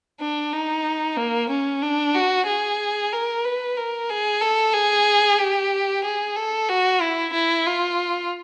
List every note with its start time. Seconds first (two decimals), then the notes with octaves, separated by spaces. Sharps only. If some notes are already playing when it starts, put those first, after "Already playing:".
0.21 D4
0.53 D#4
1.17 A#3
1.50 C#4
1.82 D4
2.15 F#4
2.47 G#4
3.12 A#4
3.45 B4
3.77 A#4
4.10 G#4
4.41 A4
4.74 G#4
5.38 G4
6.04 G#4
6.36 A4
6.69 F#4
7.01 E4
7.33 E4
7.67 F4